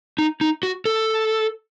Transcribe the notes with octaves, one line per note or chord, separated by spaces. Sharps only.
D#4
D#4
F#4
A4